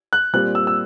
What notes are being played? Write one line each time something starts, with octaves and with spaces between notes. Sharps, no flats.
F#6
A#2 G3 C4 F#6
E6
E6